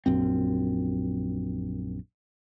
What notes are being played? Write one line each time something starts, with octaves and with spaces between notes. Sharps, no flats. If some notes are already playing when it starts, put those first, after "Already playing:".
A#1 F#2 C4